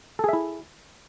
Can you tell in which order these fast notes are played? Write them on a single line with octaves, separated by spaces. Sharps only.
A4 G#4 E5 E4